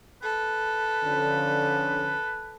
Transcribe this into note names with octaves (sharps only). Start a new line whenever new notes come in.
A4 B4
D3 F3 C#4